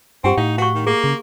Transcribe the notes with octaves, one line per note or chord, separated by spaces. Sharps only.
G2 C4 G4 F#5 G5
A2 D#4 F5
F#4 F5 C#6
D#3
A#3 G#4
C#3